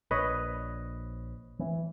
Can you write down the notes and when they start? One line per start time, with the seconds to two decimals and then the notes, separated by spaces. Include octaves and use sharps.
0.11 A#1 B4 C#5 D#5
1.59 E3